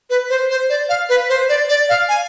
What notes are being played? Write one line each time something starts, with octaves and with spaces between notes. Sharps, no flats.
B4
C5
C5
D5
F5
B4
C5
D5
D5
F5
G#5